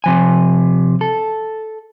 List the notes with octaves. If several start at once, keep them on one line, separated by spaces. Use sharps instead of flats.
C3 F3 G#5
A4